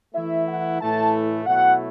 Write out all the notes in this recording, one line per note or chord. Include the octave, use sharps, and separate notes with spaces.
E3 A3 E4 E5
F#5
A2 E3 A3 E4 A5
B2 F#3 A3 E4 F#5